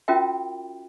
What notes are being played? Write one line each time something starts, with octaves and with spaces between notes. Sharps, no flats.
C#4 F4 F#4 A#4 E5 G5